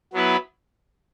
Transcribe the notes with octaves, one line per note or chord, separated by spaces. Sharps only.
F#3 B3 E4 B4